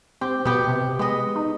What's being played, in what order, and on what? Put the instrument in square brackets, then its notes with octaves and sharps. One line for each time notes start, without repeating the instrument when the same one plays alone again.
[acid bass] C4 [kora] G4
[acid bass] B2 [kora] B3 G4
[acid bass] C3
[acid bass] G#3 [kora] B3 D#5
[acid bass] D#4